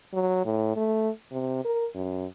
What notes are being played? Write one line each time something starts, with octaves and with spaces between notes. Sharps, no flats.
F#3
A2
A3
C3
A#4
F#2